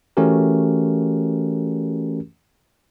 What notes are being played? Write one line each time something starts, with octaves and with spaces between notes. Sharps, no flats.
E3 A3 C#4 F#4 G4 A#4